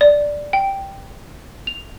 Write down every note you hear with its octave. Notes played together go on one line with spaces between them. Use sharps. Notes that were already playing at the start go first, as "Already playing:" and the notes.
D5
G5
F7